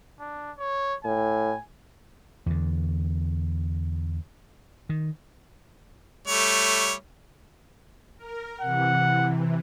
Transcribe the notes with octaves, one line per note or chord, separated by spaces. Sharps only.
D4
C#5
A2 G#5
E2 D3
D#3
G3 A3 C#5
A#4
C3 E3 F#5